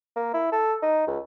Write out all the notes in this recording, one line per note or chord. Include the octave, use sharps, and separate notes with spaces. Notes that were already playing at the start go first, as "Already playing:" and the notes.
A#3
E4
A4
D#4
C#2